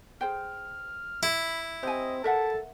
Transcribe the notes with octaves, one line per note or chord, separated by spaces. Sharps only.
G#4 C5 G5 F6
E4 B5
C4 G4 D#5 G#5
A4 A#4 E5 F#5 A5